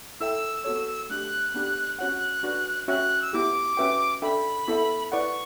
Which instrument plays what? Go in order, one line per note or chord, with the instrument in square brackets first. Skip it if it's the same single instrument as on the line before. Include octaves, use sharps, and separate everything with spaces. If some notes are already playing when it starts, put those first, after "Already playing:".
[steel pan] E4 A4 E5 G5 [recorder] E6
[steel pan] B3 F#4 A4 C#5
[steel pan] A3 D4 G4 [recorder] F#6
[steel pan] B3 D4 G4
[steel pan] C#4 F#4 C#5 F#5 [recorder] F#6
[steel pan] D4 F#4 B4 D5
[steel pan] C#4 F#4 C#5 E5 G5 [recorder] F#6
[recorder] E6
[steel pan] B3 E4 G4 [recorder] D6
[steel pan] C#4 F#4 B4 E5 G5
[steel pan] D4 A4 E5 G5 [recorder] B5
[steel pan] B3 E4 A4 E5
[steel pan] E4 B4 D5 F#5 [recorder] C#6